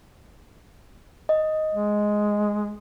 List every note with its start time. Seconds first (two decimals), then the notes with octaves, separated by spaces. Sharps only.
1.29 D#5
1.74 G#3